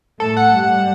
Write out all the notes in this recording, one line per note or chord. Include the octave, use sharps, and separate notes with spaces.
A2 A3 A4
F#5
G2 G3